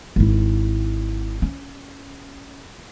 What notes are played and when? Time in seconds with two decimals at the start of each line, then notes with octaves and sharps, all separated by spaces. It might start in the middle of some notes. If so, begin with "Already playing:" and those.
0.16 G#1 E4
1.42 C#4